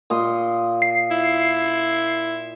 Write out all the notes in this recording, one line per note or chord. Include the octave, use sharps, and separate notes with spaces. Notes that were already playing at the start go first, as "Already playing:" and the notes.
A#2 D#5 C6
C7
E4